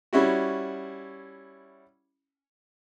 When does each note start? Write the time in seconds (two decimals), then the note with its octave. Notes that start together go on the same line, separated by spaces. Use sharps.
0.13 G3 C#4 E4 F#4